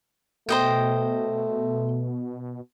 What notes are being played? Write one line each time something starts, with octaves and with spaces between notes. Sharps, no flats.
B2 A3 C5 D#5 G5